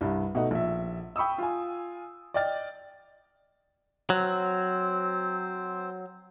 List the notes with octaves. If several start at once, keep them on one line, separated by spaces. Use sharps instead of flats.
C2 G2
B2 A3 D#4 F#5
A#1 E5
G5 B5 C#6 D#6 E6
F4 G#5
D5 D#5 G5 F6 A6
F#3 C4 C5